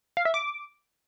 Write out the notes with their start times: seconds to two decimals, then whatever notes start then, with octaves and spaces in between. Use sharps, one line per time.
0.17 F5
0.25 E5
0.34 D6